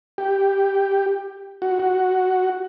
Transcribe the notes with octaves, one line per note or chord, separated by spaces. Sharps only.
G4
F#4
F#4